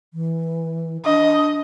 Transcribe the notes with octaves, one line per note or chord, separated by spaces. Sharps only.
E3
D4 D#5